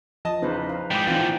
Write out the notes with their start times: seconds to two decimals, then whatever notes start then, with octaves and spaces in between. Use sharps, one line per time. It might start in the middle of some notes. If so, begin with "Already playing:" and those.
0.25 F3 D#5 A5
0.42 E2 C#3 D#4 B4 C5
0.69 B4 F5
0.91 G#2 G3 G#3 G5 D6
1.07 A#2 D3 E3 C4 D#4 F4